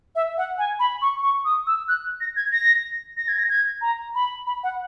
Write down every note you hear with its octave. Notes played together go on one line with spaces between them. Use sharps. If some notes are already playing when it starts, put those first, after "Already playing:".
E5
F#5
G#5
B5
C#6
C#6
D#6
E6
F#6
A#6
G#6
A#6
A#6
G#6
A#6
G#6
A#5
B5
B5
F#5